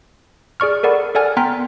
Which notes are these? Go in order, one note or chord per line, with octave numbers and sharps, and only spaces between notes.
G#4 D5 C#6 F6
A4 A#4 D5 F#5 B5
A4 D5 F#5 G#5 F6 A6
B3 G5 A#5 C6 F6 B6